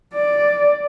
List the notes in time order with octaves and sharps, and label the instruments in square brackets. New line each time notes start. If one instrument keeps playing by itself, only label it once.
[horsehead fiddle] D5